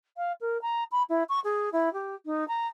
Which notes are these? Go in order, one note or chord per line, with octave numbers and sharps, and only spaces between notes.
F5
A#4
A#5
B5
E4
C#6
G#4
E4
G4
D#4
A#5